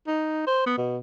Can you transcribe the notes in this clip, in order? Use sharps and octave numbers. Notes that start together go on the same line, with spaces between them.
D#4
C5
B3
B2